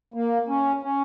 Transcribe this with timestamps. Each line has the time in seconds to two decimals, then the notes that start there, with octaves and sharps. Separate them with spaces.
0.14 A#3
0.48 C#4
0.83 C#4